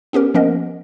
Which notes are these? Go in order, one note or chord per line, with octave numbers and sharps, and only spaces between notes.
B3 C#4 G4 A#4
F3 A#3 B3 C#4 A#4 D#5